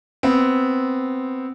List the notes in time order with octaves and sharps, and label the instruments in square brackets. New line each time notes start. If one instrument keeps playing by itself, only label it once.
[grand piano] B3 C4